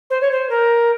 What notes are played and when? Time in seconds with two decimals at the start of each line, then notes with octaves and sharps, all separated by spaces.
0.10 C5
0.21 C#5
0.31 C5
0.49 A#4